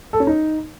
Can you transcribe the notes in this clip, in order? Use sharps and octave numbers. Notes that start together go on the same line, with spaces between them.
A4
C#4
D#4